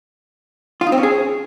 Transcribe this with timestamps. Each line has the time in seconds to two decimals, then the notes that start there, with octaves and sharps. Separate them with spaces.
0.81 F4
0.87 D#4
0.92 C4
0.98 C#4
1.03 G#4